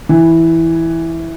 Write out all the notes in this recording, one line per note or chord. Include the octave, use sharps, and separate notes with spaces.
E3